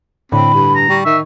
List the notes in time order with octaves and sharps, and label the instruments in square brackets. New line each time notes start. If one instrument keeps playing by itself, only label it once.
[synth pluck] A2 D3 [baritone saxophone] C4 [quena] B5
[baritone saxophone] G2
[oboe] A#5
[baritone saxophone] G3 [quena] C#6
[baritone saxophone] D#3 [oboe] E5